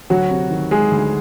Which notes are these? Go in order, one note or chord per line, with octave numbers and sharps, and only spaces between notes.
D2 F#3 F#4
C3
D#3
G#3 G#4
D2